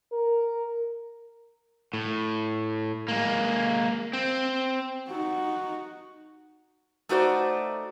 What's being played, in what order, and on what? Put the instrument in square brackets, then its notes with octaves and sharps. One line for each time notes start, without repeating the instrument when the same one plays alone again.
[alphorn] A#4
[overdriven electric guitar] A2
G#3 A#3
C4
[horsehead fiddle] D#4 F#4
[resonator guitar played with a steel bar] A3 D#4 F#4 C5 D5